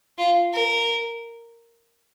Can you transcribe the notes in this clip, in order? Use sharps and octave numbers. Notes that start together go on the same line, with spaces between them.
F4
A#4